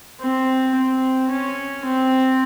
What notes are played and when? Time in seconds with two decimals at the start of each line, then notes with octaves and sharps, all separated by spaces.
0.20 C4
0.75 C4
1.30 C#4
1.85 C4